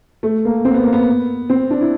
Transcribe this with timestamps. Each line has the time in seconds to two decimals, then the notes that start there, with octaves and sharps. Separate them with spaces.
0.23 A3
0.45 A#3
0.65 C4
0.74 B3
0.83 A#3
0.93 B3
1.50 C4
1.71 D4
1.81 E4